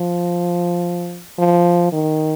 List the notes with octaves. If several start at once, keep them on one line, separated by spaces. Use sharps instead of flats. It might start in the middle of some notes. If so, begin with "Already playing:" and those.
Already playing: F3
F3
D#3